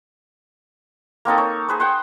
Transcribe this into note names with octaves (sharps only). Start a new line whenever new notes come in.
A#3 C4 D#4 A4
C#5
G#4 B4 C5
C5 F#5 G5